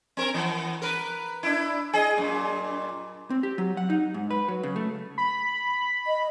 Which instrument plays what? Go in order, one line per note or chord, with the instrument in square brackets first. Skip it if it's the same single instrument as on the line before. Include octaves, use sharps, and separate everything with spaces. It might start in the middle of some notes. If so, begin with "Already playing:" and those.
[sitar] C4 A#4
E3 B3
A#4 B4
D4 E4
G#4 D#5
F#2 A#2
[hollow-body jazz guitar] C4
G4
F#3
F#5
D#4
G#2
B4
F#3
C#3
A3
[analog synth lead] B5
[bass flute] D#5